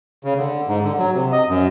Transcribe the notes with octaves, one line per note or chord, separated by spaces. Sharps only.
C#3
D3
G#2
D3
F#3
C3
D#5
F#2